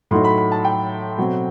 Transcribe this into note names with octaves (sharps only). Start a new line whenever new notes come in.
A2 F#3 A3 D#4 C6
B5
B5
A5
G5
B2 F#3 A3 C4